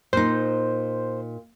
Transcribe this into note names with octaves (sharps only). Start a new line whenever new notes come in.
A#2 D#4 C5